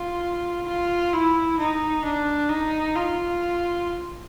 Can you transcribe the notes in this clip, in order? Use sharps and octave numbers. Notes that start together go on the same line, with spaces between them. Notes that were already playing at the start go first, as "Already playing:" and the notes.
Already playing: F4
F4
E4
D#4
D4
D#4
F4